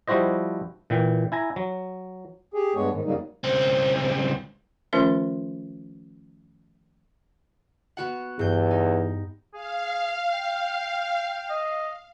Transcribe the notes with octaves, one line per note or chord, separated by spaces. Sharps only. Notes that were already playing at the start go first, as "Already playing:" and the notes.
F3 G3 E4 F#4 C5 D#5
A#2 E3 G5
E4 G#5 A#5
F#3
G4 G#4
G2 G#3 B3 C#5
G#2 D#3
F2 C#3 F#3 G3 A#3 D#4
C#2 C4
D#3 F3 A3 C#4 F4 A#4
B3 F#4 F#5
E2 G2 G6
D#4
G#4 F5
G5
D#5